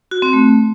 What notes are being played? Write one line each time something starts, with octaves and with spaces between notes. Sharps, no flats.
F#4
C4
A3